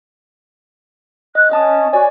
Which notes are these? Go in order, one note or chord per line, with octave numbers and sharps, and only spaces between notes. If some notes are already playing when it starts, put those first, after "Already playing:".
D#5 F#6
C#4 D#5 A5 D#6
F#4 C#5 D5 G#5